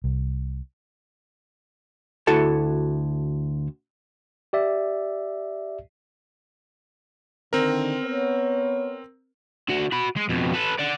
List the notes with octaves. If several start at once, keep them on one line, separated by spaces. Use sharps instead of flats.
C2
D2 E4 F#4 A4 A5
G4 D5 E5
D3 D#3 C4 A#4
B3 C#5
D3 F#4
F#4 B5
G#3
F2 B2
A4 B4
D5 F#5